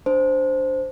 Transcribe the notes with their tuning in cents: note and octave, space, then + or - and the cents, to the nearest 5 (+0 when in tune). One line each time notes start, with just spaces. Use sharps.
D4 +0 C5 -5 A5 +0